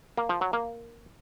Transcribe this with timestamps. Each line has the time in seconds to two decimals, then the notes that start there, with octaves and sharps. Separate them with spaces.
0.17 A#3
0.29 F3
0.41 F#3
0.53 A#3